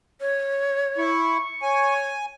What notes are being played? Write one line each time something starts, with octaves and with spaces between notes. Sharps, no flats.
C#5
E4 C#6
C#5 G#5